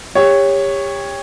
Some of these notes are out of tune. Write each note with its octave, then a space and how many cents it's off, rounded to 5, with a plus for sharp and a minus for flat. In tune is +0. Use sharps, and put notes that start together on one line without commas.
G4 +30 C#5 +0